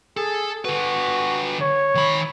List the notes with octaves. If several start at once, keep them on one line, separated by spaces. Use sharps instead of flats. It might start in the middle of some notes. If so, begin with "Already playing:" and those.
G#4 A4
D3 F#4 B4
C#5
D#3 B5